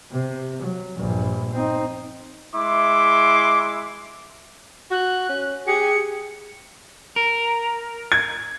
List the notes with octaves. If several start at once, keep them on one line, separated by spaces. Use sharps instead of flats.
C3
F#3
A#1 G2
C4 D#4
G#3 E4 C6 D6
F#4 F#6
C#4
G4 G#4 C#7
A#4
G#6